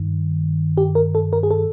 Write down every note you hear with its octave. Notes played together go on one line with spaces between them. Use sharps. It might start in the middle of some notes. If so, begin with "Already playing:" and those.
Already playing: G2 D#3
G4
A#4
A4
A#4
G#4
A4